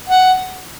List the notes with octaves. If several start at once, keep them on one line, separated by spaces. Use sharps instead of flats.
F#5